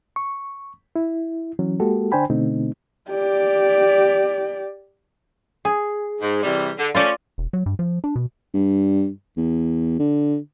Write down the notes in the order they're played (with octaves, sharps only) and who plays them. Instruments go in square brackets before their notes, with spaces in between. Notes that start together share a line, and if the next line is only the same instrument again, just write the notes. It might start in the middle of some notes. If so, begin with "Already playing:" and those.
[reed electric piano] C#6
E4
E3 F#3 C#4
G#3 A#3 F#4 G4 A4
D3 D4 C5 G5 G#5 B5
B2 D3 A3 C4 D#4
[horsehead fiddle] G4 D5
[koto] G#4
[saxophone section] G#2
C3 E3 G3
D3
[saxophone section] A3 C#4 [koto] F4 C5 D5
[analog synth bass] E1
F#3
G2
F3
D4
B2
[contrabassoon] G2
E2
D3